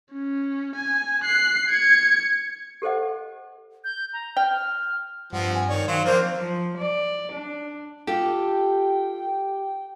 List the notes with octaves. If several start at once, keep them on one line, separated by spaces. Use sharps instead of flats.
C#4
G#5
F#6 C7
G#6 C#7
G4 A4 C5 D#5 F#5
G6
A#5
G5 F6
G2 F3 C4 F#5
G2 G#5
D#3 C#5 D5
D#3 F#3 C5 F5
F3 A#3 C4 D4 C5
F3
D5
D4
F4 G4 A4 G5